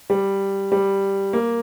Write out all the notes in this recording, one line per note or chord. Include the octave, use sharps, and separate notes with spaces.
G3
G3
A#3